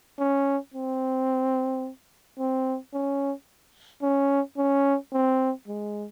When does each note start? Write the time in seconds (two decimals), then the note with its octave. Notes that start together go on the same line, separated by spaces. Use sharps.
0.19 C#4
0.74 C4
2.39 C4
2.93 C#4
4.02 C#4
4.57 C#4
5.13 C4
5.68 G#3